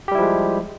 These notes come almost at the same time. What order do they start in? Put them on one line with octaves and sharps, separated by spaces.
G4 G3 E4 F3 G#3